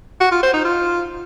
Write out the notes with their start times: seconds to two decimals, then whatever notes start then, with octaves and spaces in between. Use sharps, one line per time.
0.21 F#4
0.32 F4
0.43 C5
0.54 D#4
0.65 F4